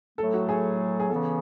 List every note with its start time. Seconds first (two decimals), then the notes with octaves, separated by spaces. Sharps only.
0.18 A2 F#3 A3 A4
0.34 F#4
0.49 G#4
1.00 G#4
1.09 C#3 E3 B3 A4